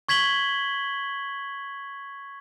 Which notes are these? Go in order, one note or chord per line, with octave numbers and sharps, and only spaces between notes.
C#6 G#6 B6 F#7 G7